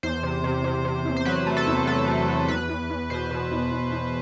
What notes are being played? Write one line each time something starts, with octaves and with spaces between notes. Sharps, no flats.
E2 C5
C3
C3
C3
C3
E2
C5
F#3 B4
A3
A4
E2
F#3 A4
A3
F#3
E2 B4
E2
E2
B2 C5
B2
E2
E2
E2